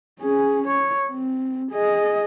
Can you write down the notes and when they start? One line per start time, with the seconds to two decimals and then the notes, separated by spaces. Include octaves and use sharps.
0.20 C#4 G#4
0.68 C#5
1.10 C4
1.71 G#4 D#5